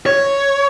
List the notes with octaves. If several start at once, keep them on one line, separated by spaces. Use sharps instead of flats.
C#5